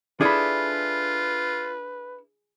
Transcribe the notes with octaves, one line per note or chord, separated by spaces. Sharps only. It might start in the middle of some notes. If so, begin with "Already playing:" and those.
D4 E4 F4 G#4 A4 B4 B5